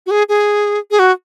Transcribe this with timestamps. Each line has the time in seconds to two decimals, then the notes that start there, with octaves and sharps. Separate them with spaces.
0.06 F#4
0.11 G#4
0.29 G#4
0.91 G#4
0.99 F#4